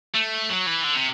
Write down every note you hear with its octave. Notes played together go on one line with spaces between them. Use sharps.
A3
F#3
E3
D3
C3